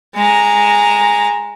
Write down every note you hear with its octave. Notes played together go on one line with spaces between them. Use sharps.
G#3 A#5